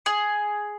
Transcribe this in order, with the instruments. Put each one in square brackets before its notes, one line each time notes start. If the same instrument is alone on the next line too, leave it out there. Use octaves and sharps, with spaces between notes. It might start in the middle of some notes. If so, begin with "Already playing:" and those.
[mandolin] G#4